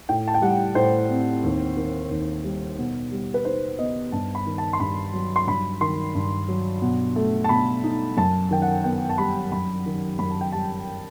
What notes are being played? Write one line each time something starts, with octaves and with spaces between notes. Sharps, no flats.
A2 G5
A5
G5
G3 F#5
A2 C5
C4
D#2
D#3
D#2
G3
B2
G3
B4
D#4 C5
B3 D#5
G2 A5
B5
D#3
A5
C6
G2 B5
F#3
C6
G2 B5
D#3 C6
G2
F#3
B2
A3
A5
B2 B5
D#4
F#2 A5
D#3 G5
F#5
B3 G5
A5
G3 B5
F#2 B5
D#3
F#2 B5
A5
G5
G3 A5